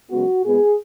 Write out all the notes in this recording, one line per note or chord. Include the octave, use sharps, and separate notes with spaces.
F#2 C#3 G#3 B3 F#4
A#2 G#3 B3 G#4